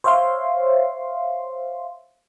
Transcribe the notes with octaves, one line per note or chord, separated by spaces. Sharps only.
C5 C#5 E5 F5 C6